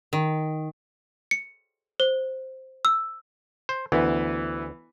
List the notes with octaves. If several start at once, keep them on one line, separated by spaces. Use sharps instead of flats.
D#3
C#7
C5
E6
C5
D2 E3 B3